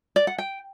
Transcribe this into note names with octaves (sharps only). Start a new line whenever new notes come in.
D5
F#5
G5